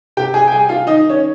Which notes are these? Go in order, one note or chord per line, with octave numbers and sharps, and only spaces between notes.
C3 G4 G5
G#4 G#5
G5
G3 G#4 G#5
F4 F5
D#3 D#4 D#5
C#4 C#5